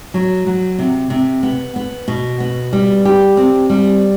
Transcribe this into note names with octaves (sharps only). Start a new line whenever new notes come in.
F#3
F#3
C3
C3
B3
B3
B2
B3
G3
G4
C4
G3